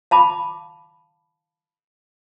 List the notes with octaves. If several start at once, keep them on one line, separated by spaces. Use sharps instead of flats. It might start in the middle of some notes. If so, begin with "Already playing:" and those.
F5 A5 B5 D6